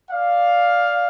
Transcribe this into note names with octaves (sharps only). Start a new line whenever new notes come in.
D5 F5